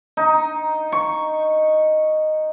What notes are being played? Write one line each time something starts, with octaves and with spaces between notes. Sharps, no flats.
D#4
C#6